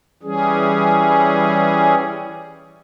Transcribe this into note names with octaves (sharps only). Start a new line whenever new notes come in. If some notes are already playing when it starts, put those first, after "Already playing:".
E3 G3 C#4 G#4